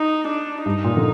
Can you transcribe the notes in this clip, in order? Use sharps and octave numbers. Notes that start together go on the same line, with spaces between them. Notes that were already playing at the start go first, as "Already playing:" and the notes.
Already playing: D#4
D4
G2 D#4
A#2
D3